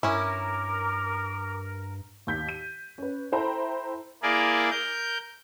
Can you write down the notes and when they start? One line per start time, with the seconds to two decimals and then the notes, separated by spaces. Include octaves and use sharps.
0.03 G2 C#4 E4 A#4 D6
2.27 D#2 G6 B6
2.49 D#7
2.98 C#4 B4
3.32 E4 A4 C5 G5 A#5 B5
4.23 A#3 E4 G#4 A#4 D5
4.71 A#4 G6